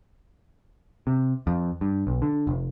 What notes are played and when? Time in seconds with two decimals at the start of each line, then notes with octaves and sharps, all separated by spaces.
1.07 C3
1.47 F2
1.81 G2
2.07 B1
2.22 D3
2.47 F1